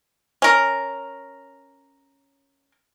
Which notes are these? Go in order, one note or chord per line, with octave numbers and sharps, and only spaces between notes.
C#4 A#4